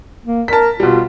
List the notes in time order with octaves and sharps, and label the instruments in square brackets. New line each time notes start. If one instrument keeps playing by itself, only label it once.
[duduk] A#3
[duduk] A#4 [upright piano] A5 B6
[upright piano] B2 G3 [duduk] F4